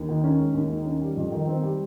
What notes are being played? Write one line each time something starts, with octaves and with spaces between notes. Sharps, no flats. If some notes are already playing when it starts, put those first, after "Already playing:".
Already playing: D#2
D#3
C#4
G#3
D#2
D#3
C#4
G3
F2
D#3
C4
G3